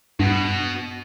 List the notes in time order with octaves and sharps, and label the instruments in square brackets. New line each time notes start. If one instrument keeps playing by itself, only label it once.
[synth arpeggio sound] G2 [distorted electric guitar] B2 B3